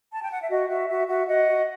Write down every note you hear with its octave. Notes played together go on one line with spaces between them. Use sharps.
A5
G5
F#5
E5
F#4 D#5
F#4 E5
F#4 E5
F#4 E5
F#4 D#5 F#5
F#4